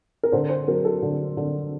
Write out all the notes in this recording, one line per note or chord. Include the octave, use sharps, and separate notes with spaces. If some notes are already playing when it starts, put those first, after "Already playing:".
A#4
D3 C5
C5
F#3 A#4
A4
D3
D3